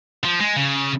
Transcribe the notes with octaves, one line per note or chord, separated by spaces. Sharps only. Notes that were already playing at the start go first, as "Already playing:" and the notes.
F3
G#3
C#3